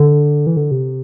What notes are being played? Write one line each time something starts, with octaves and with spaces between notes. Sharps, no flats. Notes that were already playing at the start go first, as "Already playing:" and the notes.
Already playing: D3
E3
D3
C3